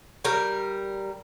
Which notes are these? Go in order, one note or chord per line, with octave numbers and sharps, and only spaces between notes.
G3 A#4